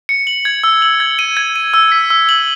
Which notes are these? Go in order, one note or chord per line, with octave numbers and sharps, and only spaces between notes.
C#7
F#7
G#6
E6
F#7
G#6
D#7
G#6
D#7
E6
B6
E6
F#7